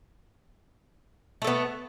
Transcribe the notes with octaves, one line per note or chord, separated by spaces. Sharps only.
A3 B3 A4